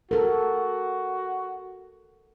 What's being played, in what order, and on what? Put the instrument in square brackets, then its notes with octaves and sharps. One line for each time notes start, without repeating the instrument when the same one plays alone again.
[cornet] F#4 [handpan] A4 A#4